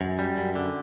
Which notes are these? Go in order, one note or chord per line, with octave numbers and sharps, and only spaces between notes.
F#2
G3
F#2
D3